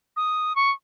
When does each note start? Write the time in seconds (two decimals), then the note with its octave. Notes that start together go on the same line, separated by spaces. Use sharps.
0.17 D#6
0.56 C#6